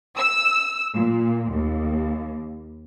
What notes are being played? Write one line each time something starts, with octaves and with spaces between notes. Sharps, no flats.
E6
A#2
D#2